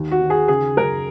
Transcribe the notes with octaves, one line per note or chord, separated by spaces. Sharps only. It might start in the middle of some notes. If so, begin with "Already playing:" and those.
Already playing: D#2
F#4
D#3
G#4
C#3 G#4
F#2 A#4